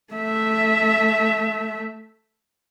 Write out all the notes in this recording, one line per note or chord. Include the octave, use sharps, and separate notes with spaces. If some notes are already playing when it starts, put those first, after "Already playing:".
A3 E5